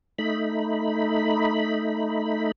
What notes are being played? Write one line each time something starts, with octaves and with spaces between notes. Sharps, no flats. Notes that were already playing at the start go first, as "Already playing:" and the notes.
A3 D#4 B5